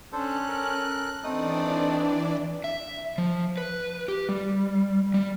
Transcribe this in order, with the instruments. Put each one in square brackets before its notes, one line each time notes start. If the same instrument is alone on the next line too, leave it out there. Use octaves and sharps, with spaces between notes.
[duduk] C#4 [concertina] D4 A4 C5 [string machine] F#6
[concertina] A4 A#4
[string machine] E3 D4 D5 [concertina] A3 D#4 D#6 [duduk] C4
[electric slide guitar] E5
F3
B4
G4
G3
G3